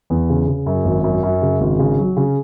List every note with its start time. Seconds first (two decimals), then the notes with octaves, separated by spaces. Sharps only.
0.10 E2
0.30 C#3
0.48 C#3
0.66 F#2
0.85 G#1
1.04 F#2
1.23 F#2
1.42 C#3
1.61 G#1
1.79 C#3
1.98 F#3
2.17 C#3